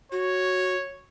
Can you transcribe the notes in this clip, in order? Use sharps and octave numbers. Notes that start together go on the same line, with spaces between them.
F#4 C#5